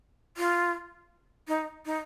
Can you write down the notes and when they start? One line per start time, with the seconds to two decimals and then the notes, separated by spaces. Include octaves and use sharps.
0.37 F4
1.48 D#4
1.86 D#4